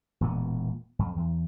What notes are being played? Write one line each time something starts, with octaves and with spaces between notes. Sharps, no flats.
E1 A#2 B3
F2
E2